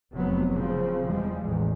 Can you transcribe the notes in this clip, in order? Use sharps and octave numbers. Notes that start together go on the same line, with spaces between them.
F1 C3 F#3 B3
C#3 F3 C4
E2 F3 G3 G#3
A1 E2 G#3